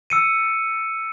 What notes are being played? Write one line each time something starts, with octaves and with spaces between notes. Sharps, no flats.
E6 C#7 D#7